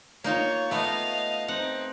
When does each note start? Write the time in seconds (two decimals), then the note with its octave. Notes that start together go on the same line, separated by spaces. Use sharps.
0.24 A#3 D#4 F4 C#5 C#6
0.71 A3 B3 D#5 F5
1.48 C4 D#4 F#5